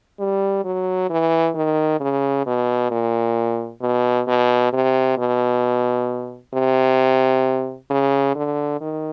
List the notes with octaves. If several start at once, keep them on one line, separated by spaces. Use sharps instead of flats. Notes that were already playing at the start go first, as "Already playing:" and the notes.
G3
F#3
E3
D#3
C#3
B2
A#2
B2
B2
C3
B2
C3
C#3
D3
D#3